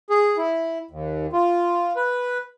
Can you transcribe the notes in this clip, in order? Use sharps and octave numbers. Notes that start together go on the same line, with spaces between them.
G#4
E4
D#2
F4
B4